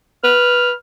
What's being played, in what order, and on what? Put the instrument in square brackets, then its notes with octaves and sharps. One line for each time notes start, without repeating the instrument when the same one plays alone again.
[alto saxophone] B4 [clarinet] F6